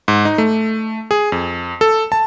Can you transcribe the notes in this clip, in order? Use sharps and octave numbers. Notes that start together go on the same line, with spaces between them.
G#2
D#4
A3
G#4
F2
A4
A5